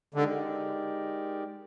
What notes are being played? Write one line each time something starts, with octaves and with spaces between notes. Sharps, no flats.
D3 G#3 D#4 G4 A#4 D5